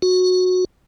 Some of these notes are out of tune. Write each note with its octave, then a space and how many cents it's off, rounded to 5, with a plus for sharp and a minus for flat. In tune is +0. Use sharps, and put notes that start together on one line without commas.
F#4 -15